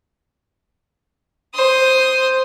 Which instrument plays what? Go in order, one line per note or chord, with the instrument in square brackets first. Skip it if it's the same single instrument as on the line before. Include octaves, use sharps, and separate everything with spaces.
[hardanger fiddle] C5 D#6